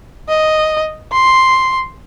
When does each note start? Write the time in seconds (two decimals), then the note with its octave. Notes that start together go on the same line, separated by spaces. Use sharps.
0.29 D#5
1.12 C6